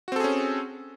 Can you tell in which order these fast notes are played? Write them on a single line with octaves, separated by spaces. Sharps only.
F#4 C4 A4 G#4 C#4